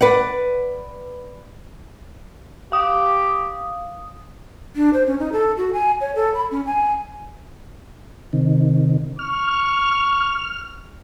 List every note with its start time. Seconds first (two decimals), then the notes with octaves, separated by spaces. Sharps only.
0.01 B4 D5 F#5
2.72 G4 F5 D#6
4.76 D4
4.94 C5
5.06 C#4
5.19 D#4
5.33 A4
5.57 F#4
5.73 G#5
6.01 C#5
6.16 A4
6.34 B5
6.51 C#4
6.66 G#5
8.33 C3 D#3
9.19 C#6 F6